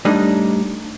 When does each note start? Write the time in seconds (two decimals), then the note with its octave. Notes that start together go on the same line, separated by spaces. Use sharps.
0.05 A2 G3 D4 D#4